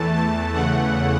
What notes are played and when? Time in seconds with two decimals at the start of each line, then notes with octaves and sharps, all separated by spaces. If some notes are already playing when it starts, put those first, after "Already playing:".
Already playing: E2 E3 A3 A5
0.14 A5
0.53 E2 C#3 E3 A3 F#5